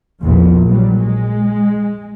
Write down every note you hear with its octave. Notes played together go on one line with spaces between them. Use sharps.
A#1 E2 A#2 F3
A#2 F#3 G3
G#3